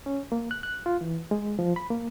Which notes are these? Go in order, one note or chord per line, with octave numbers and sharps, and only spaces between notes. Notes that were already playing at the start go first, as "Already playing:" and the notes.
C#4
A#3
F#6
F#6
F4
E3
G#3
F3
B5
A#3